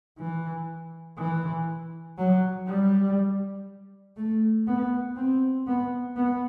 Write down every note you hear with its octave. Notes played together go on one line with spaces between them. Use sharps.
E3
E3
F#3
G3
A3
B3
C4
B3
B3